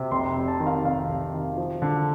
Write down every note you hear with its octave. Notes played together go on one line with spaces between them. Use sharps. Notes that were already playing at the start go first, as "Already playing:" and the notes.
Already playing: C3
F1 C6
F1
A5
D#3
F5
F1 F5
F1
D#3
F3
D3